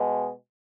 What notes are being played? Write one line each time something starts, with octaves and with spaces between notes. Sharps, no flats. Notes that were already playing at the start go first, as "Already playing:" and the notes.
Already playing: B2 G#3